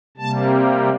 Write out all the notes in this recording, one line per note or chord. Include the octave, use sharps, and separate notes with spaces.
C3 G3 A#3 A5